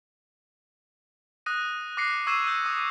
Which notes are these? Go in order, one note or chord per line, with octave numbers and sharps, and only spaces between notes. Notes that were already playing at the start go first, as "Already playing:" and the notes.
D#6 F#6 A#6 D#7
D6 F#6 A#6 C7 C#7
C#6 E6 G#6 C7 D#7 E7
E6 G6
D#6